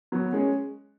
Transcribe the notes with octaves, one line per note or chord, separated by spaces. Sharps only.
F#3 B3
G#3 C#4